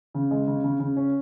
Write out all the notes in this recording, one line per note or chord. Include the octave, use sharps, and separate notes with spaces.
C#3
G#3
C#3
C#3
C#3
C#4